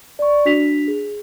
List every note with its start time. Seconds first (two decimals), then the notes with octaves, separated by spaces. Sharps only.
0.19 D5 C#6
0.45 D4 F#4 B6 F7
0.88 G#4